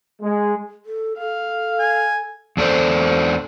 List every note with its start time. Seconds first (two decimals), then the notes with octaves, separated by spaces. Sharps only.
0.22 G#3
0.86 A4
1.18 A4 F5
1.80 G#5
2.57 E2 D4 A4 C5